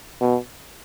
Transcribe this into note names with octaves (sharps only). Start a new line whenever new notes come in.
B2